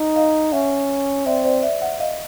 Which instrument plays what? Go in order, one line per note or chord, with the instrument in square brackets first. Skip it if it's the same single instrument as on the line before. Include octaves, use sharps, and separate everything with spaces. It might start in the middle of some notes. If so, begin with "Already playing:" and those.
Already playing: [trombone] D#4
[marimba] D#5 F5
[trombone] C#4 [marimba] E5 F#5
[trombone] C4 [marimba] D5 E5
[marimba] C5 D5
D5 E5
E5 F#5
D#5 F5